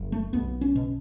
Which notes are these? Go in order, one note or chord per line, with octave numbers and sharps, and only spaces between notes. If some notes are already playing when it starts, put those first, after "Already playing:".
Already playing: F#1
A3
B1 B3
C#4
B2